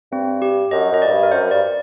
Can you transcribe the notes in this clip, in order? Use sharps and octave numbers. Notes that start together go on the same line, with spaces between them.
G2 C4
G4
F#2 D#5
F#2 D#5
A2 D5
G2
A#4
F#2 C5
G2 D5